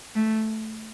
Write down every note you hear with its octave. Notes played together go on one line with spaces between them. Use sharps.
A3